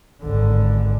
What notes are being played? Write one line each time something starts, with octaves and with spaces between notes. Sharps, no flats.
G#1 D3